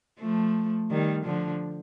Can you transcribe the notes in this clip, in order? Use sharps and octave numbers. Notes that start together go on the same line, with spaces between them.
F3 A3
D#3 G3
D3 F3